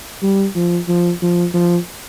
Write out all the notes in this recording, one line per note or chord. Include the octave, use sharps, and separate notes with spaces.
G3
F3
F3
F3
F3